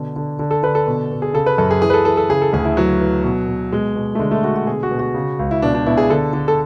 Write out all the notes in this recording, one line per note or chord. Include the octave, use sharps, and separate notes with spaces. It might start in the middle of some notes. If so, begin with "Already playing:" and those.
Already playing: B2 D3
D3
D3
A4
D3 B4
A4
B2
B2
G#4
C#3 A4
B4
F#2 A4
G#4
E3 G#4
B4
A4
E3 A4
A4
C#3 G#4
A4
D2 G#4
E4
E3 F#3
E3
B2
B2
B2 G#3
B2
A3
D3 G#3
A3
D3 F#4
F#4
B2 G#4
F#4
B2
F#4
C#3
C#2
E4
B2 D4
D4
B2 E4
G#4
D3 A4
D3
A4